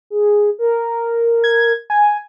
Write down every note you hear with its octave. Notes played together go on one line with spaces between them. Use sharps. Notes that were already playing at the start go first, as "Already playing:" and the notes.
G#4
A#4
G#6
G#5